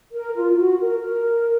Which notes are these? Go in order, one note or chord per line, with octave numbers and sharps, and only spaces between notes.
A#4
F4
F4
F#4
A#4
A#4